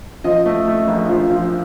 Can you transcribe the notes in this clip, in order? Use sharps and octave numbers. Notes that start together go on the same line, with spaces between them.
F3 D#5
A3
A3
A#1
F3
F3